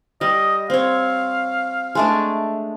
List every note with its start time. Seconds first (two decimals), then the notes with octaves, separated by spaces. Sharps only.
0.21 G3 D#5
0.70 C4 C#5 F5
1.95 G#3 A3 D4